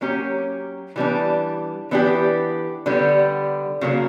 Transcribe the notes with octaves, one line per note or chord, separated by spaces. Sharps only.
F#3 A#3 C#4 G4
E3 G3 B3 D4
E3 B3 D4 G4
D3 G3 B3
C#3 F#3 A#3